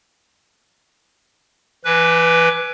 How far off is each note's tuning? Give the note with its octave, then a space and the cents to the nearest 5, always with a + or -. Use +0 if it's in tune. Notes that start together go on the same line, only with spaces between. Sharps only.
E3 +30 B4 +0